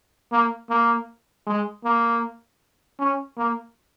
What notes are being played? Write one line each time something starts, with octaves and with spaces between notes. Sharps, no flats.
A#3
A#3
G#3
A#3
C#4
A#3